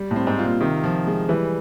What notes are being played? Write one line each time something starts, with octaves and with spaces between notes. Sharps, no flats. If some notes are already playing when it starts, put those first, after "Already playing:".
Already playing: G3
A2
C4
G#2
F4
A#2
C3 D#3
F3
G#3
E3 G3